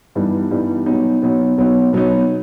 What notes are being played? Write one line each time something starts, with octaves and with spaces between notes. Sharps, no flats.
G2 E3 G3 B3 D#4
G2 E3 G3 B3 D#4
B2 F#3 B3 D#4
B2 F#3 B3 D#4
B2 F#3 B3 D#4
B2 F#3 B3 D#4